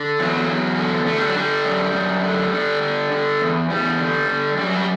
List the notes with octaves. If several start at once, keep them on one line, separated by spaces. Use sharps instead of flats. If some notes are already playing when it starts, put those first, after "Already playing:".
Already playing: D3
E2 F#3
E2
D3
D3 A3
G3
F#3
D3 G3
F#2
F#2
D3
D3
D3
D3
E2
E2 G3
D3
D3
F#2 G3
F#3
G3